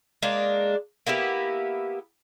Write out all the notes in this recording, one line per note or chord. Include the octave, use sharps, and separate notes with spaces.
G#3 A#3 D4 F5
A#3 B3 E4 G4